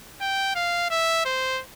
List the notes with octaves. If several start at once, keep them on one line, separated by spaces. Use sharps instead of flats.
G5
F5
E5
C5